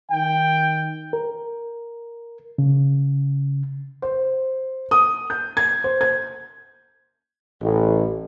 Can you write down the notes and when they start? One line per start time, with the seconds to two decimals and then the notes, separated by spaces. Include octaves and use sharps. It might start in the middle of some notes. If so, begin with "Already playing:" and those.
0.12 D#3 G5
1.13 A#4
2.58 C#3
4.02 C5
4.91 D#6
5.30 G6
5.57 G#6
5.84 C5
6.01 G#6
7.61 A1